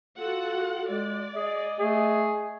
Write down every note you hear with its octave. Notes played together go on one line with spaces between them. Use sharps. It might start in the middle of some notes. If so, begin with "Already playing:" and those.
F4 F#4 A4 F#5
G#3 D5
G#4 D#5
A3 G#4